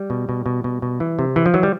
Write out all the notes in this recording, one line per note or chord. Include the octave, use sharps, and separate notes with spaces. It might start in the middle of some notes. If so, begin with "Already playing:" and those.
Already playing: G3
B2
B2
B2
B2
B2
E3
C3
E3
F3
E3 F#3
G3